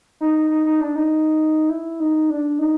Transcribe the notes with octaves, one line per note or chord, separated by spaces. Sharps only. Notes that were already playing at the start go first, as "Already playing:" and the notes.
D#4
D#4
D#4
D4
D#4
E4
D#4
D4
D#4